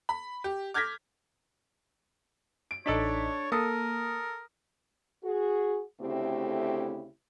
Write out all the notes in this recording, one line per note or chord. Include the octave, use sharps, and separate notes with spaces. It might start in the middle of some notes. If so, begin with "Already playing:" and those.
B5
G4
D6 F6 G6 G#6 A#6 B6
D7
A1 D4 D#4 A4 C#5 B6
A#3 A4 A#4 D#6
F#4 G#4
D2 C#3 A3 C4 E4 G4